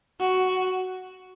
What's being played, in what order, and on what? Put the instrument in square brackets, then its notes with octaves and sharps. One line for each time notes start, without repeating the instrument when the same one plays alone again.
[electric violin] F#4